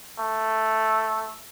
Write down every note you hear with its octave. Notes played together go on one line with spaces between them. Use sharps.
A3